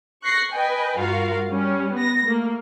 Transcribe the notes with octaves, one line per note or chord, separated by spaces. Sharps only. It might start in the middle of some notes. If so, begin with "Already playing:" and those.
C#6 F#6 A#6 C7
B4 D#5 G5 G#5
G2 F4 F#4 A#4 F5
G3 C#4
B3 A#6
A3 A#3